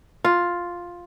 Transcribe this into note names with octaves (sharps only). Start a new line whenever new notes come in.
F4